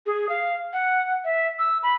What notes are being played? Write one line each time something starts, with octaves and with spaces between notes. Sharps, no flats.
G#4
F5
F#5
E5
E6
B5